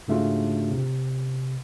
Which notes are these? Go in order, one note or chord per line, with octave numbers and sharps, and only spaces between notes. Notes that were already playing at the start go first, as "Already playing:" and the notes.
G#2 C#3 A3 D4 F4 F#4
C3